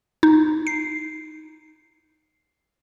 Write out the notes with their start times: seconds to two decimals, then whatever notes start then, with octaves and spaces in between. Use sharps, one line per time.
0.23 D#4
0.67 C7